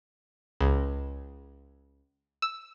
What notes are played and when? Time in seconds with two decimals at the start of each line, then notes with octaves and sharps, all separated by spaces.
0.60 C#2
2.42 E6